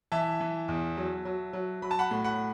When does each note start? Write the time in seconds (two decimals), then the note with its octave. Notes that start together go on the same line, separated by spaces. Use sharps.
0.12 E3 E5 A5
0.40 E3
0.68 E2
0.97 F#3
1.25 F#3
1.53 F#3
1.82 F#3 B5
1.91 A5
1.99 F#5 B5
2.11 A2
2.24 F#5 B5